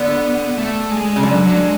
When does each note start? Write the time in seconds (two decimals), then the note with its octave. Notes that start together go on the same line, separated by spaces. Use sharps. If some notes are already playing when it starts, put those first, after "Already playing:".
Already playing: D3 B3
0.58 A3
0.91 G#3
1.16 C#3
1.23 D3 F#3
1.45 F#3
1.56 G#3